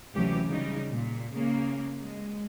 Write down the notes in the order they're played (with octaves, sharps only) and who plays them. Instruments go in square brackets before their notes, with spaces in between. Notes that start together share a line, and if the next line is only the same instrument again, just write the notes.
[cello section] D2 C3 E3 F#3 C#4 G4
C#3 G3 D#4
A#2
C#3 A#3
G#3